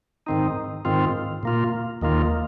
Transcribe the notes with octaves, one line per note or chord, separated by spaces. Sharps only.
G#2 D#3 C4 D#4
G#2 D#3 C4 F4
A#2 A#3 F4
D#2 D#3 A#3 F4